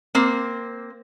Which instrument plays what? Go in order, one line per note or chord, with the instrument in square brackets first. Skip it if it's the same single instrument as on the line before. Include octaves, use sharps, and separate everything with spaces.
[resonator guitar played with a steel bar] A#3 C4